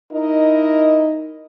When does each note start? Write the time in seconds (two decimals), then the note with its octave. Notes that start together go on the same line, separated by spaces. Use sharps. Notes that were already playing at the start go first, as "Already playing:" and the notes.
0.13 D#4 E4 A#4 D#5